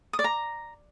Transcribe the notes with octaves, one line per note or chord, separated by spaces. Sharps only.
D#6
D5
A#5